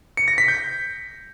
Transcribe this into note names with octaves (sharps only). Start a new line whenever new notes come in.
C#7
A#6
B6
G6